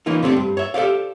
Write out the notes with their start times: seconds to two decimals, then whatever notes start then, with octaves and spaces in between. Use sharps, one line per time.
0.06 E3 A#3 C#4 D#4 F4
0.23 C3 A3 C4 D4
0.36 G2
0.57 C#5 E5
0.74 G4 A4 C5 D5 F5